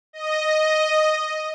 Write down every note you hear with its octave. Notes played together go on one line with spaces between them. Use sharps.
D#5